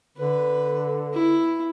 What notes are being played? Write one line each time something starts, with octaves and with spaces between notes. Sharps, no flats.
D3 B4
E4